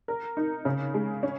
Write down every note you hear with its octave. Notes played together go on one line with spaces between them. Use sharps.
A#4
D#4
C#3
G#3
C#4